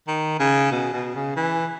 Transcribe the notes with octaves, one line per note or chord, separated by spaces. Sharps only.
D#3
C#3
B2
B2
C#3
E3